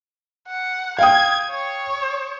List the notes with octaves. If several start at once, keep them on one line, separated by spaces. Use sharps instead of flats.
F#5
F5 G5 D#6 G#6
C#5